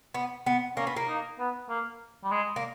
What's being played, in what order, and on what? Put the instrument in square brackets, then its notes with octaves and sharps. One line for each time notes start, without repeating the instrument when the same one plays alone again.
[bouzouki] B3
B3
[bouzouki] A#3 [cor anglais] C#4
[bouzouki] B3
A#3
[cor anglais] D#4
B3
A#3
G3
G#3
[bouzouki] A#3